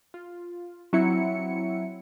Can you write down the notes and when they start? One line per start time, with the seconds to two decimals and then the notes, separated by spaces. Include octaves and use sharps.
0.14 F4
0.93 F#3 C4 E4 E5 C#7